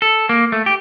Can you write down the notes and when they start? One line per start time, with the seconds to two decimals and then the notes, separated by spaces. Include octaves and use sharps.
0.02 A4
0.29 A#3
0.52 A3
0.66 G4